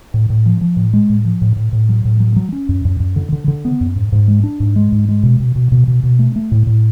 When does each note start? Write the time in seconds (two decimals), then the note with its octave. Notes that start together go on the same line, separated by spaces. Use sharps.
0.14 A2
0.30 A2
0.46 F3
0.61 F3
0.76 A2
0.93 G#3
1.10 A2
1.25 F3
1.41 A2
1.56 A2
1.73 A2
1.89 F#3
2.05 A2
2.20 F#3
2.36 F#3
2.52 C#4
2.69 F#2
2.85 F#2
3.00 F#2
3.16 D3
3.32 D3
3.48 D3
3.65 B3
3.81 F#2
3.96 G#2
4.12 G#2
4.28 G#3
4.43 D4
4.60 G#2
4.76 G#3
4.92 G#2
5.08 G#3
5.23 B2
5.40 B2
5.56 B2
5.72 B2
5.88 B2
6.04 B2
6.19 A3
6.36 A3
6.52 A2
6.67 A2